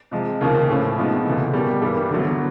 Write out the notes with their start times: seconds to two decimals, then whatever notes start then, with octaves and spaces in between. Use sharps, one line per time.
0.11 C3 F3 G#3
0.41 D#2 C#3 F3 A#3
0.68 A2 F3 A#3 C#4
0.97 C3 F3 G#3 B3 D#4
1.25 D2 C#3 E3
1.53 B2 G3 A#3
1.81 G2 E3 G3 A#3
2.10 D2 D3 F#3 B3